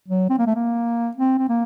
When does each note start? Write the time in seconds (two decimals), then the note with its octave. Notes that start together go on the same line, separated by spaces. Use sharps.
0.08 F#3
0.30 C4
0.39 A#3
0.47 A3
0.55 A#3
1.17 C4
1.38 C4
1.49 A#3